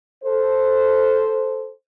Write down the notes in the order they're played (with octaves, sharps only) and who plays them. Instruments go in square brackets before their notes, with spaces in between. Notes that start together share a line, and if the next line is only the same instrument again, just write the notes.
[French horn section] A4 C5